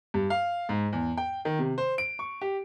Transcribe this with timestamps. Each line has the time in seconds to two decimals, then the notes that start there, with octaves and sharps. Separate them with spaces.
0.14 G2
0.30 F5
0.69 G#2
0.93 E2
1.18 G5
1.45 D#3
1.59 C3
1.78 C5
1.98 D7
2.19 C#6
2.41 G4